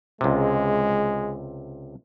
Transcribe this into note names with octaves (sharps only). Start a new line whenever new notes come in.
C#2 C3 G#3